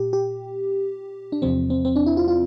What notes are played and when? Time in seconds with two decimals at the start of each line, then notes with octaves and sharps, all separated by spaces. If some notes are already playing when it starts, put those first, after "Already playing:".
Already playing: A#2 G4
0.13 G4
1.32 D4
1.42 E2 C3 F3 C4
1.70 C4
1.85 C4
1.96 D4
2.06 E4
2.17 F4
2.28 F4